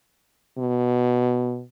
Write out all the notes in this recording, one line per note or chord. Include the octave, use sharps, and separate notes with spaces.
B2